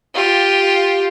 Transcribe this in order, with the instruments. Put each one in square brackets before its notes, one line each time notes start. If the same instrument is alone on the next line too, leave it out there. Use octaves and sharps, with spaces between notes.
[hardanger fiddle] F4 G4